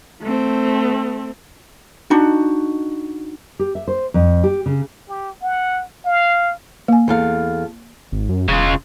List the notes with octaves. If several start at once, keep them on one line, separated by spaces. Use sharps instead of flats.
A3 C4
D4 D#4 F#4
G4
E5
C5
F2
G4
C#3
G4
F#5
F5
A#3 G#5
E2 A4 F5
G#1
F#2
E1 C#3 F4